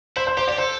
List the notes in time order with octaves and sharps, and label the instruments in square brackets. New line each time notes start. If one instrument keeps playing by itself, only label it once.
[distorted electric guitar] E4 [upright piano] C5
[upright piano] C5
[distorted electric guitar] G4 [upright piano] C5
[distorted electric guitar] G4 [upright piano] D5
[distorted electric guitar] A4 [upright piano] C5